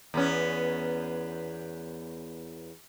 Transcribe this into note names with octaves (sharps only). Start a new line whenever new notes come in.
E2 B3 C#4